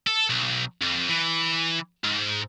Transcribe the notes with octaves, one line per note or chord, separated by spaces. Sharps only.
A4
B1
F2
E3
G#2